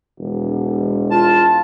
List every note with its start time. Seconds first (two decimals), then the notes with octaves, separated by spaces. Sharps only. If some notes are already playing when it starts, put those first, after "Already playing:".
0.19 E1
1.11 F4 A5